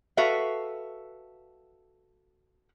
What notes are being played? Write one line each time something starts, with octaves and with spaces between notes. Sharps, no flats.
F#4 A4 B4 E5 F5